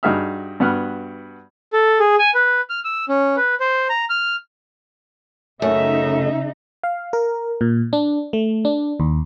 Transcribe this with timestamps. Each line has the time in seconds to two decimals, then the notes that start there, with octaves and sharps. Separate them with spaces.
0.03 G2 D#4 F#4 G#4 E5 F6
0.60 G2 B3 F#4 F#5 F6
1.73 A4
1.99 G#4
2.19 G#5
2.35 B4
2.70 F6
2.85 E6
3.09 C#4
3.36 B4
3.60 C5
3.89 A#5
4.10 F6
5.62 F#2 C#3 A3 D#4 E5
6.83 F5
7.13 A#4
7.61 A#2
7.93 D4
8.33 A3
8.65 D4
9.00 D#2